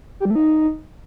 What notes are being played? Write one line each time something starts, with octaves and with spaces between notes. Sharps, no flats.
G4
G3
A3
D#4